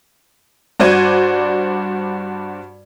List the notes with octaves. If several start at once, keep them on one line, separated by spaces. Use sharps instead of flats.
G2 F#4 C5 D5 G#6 D#7